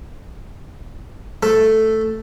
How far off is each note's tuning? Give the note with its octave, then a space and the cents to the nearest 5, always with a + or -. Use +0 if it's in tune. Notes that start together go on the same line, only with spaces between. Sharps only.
A3 +0 A4 +0